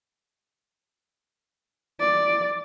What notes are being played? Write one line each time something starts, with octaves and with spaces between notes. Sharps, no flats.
D5